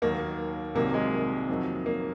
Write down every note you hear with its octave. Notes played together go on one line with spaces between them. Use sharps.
D#2 D#3 F#3 A#3
C2 C3 D#3 F#3 A#3
G#3
F2 D#3 F#3
A#3